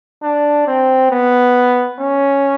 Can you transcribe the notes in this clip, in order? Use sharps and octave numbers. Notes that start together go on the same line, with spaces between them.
D4
C4
B3
C#4